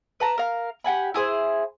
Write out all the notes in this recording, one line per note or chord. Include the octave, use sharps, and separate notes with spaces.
B4 A5 A#5
A#4 F5
G4 F#5 G#5 B5
E4 G#4 C5